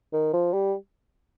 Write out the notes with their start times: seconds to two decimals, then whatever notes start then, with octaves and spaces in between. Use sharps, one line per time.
0.13 D#3
0.33 F3
0.53 G3